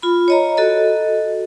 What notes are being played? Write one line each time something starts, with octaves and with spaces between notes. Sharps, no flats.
F4 B5
C#5 D#5 A#5
F#4 A4 D#5